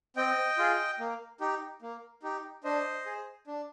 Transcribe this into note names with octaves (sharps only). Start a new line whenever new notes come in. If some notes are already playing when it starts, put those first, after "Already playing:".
C4 D#5 G5
F4 G#4
A#3
D#4 G4
A#3
D#4 G4
D4 C5 D#5
G#4
D4